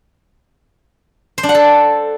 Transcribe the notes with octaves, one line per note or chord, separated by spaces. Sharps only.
C5
D4
F#5
A4